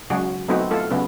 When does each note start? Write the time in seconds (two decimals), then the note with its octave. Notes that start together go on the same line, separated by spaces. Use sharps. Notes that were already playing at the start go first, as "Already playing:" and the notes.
0.10 C#3 F#3 G#3 F#4 G#4
0.48 F#3 A3 B3 C4 D#4 F#4
0.71 A3 F4 A4
0.90 C#3 F#3 B3 C#4